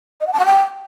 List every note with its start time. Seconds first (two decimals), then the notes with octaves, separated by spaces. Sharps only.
0.21 D#5
0.27 F#5
0.33 A5
0.39 F#5
0.45 G5